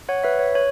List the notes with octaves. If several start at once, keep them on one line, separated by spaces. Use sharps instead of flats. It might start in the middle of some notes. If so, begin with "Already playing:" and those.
C#5 F#5
B4 E5
C#5
C#5